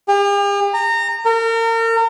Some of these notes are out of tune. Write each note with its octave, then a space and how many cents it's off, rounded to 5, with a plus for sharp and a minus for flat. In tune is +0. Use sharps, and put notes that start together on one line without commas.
G4 +45
A#5 -25
A#4 -35